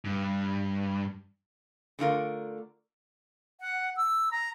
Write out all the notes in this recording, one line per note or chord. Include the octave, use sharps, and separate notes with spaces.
G2
D3 A3 F4 A#4
F#5
E6
A#5